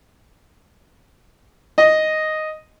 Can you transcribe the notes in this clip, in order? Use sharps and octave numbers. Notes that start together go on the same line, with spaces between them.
D#5